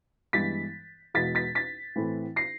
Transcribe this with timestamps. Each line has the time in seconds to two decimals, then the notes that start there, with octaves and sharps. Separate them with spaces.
0.33 G2 E3 G#3 B3 A6 B6
1.14 E2 B2 G#3 B3 A6 B6
1.35 A6 B6
1.55 A6 B6
1.96 A2 E3 A3 C4 E4
2.36 A#6 C7